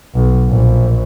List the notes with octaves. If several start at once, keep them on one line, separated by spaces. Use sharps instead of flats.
B1
A#1